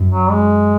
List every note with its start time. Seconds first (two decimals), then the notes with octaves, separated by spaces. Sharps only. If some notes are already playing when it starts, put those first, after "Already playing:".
Already playing: F#2
0.11 F#3
0.30 G#3